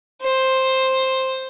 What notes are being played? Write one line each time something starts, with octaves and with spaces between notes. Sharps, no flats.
C5